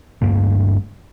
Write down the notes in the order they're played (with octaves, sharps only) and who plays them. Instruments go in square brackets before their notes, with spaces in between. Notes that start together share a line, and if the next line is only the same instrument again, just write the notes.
[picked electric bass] G1 D2 G2 A#3